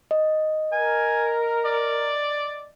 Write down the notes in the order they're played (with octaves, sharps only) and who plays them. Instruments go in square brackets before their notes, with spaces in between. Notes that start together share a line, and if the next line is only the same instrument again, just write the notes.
[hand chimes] D#5
[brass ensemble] A#4 [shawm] G#5
[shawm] D5